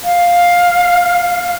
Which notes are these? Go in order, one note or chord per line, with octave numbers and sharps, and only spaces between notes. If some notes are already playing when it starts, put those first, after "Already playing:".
F5